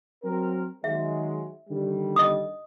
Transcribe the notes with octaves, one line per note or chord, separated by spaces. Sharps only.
F#3 C4 A#4
D#3 F#3 G#3 E5
D3 D#3 G3
D#5 D#6